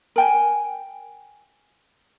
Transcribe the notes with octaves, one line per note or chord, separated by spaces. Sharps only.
A#4 G5 G#5